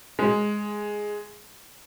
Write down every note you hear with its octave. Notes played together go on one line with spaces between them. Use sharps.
G#3